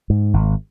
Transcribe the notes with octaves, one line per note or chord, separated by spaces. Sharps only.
G#2
G#1